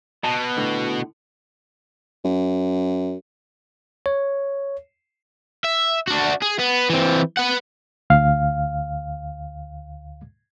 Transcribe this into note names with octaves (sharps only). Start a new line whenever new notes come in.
B2 A5
A2 D3
F#2
C#5
E5
D4 F#4
G#4
B3
E3 C4
B4 F#5
D2 F5